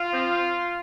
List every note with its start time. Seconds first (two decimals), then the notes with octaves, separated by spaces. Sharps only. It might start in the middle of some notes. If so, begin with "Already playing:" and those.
Already playing: F4
0.11 F3 C4